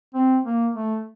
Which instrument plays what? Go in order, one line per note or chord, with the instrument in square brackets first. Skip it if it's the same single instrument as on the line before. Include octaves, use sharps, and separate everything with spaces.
[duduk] C4
A#3
A3